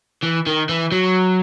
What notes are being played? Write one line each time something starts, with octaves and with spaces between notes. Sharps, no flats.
E3
D#3
E3
F#3